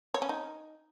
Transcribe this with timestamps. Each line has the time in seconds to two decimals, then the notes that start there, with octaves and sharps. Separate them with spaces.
0.14 C#5
0.22 C#4
0.29 D#4